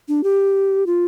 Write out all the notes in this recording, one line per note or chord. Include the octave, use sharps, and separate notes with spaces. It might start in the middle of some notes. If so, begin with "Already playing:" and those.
D4
G4
F4